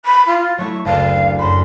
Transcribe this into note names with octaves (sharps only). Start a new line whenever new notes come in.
B5
F4
F#3 A3 E4 C#6
F#1 D2 F5 A5
F#2 B5 C6